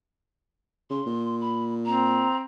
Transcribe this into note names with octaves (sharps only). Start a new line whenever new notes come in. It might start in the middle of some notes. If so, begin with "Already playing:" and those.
C#3 C6
A#2
B5
C4 A#5